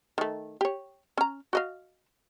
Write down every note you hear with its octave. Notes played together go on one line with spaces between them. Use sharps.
D#3 A3
G4 C#5
C#4 A#5
F#4 D#5 F5